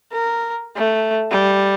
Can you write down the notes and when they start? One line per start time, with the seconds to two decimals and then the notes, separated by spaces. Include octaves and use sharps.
0.13 A#4
0.76 A3
1.31 G3